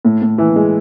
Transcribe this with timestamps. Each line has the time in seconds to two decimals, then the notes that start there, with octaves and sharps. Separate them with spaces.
0.05 A2
0.22 A2
0.38 E3
0.56 G#3